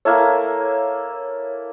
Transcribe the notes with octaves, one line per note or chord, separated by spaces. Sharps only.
A#3 E4 A4 C#5